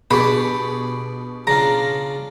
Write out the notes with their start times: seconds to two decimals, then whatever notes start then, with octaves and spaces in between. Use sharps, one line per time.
0.11 B2 D4 G4 G#4 B5 C#6
1.47 C#3 D4 F4 A#5